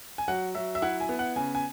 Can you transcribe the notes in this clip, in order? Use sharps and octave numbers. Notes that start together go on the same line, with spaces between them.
G#5
F#3 F#5
F#3 E5
E5
E4 F#5
G#5
B3
F#5
C#3 G#5
G#5